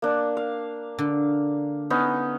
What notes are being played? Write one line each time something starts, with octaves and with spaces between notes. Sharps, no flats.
A#3 D4
F5
D3
B3 C#4 D#4